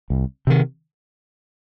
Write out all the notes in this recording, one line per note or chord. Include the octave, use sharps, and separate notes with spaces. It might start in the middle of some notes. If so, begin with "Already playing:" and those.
C2
C3 D#3